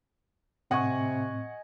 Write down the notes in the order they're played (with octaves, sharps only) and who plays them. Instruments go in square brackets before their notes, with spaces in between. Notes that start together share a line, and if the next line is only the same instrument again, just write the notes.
[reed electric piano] A2 C4 [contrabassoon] C3 [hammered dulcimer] D#5 G#5 [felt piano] F#5 C#6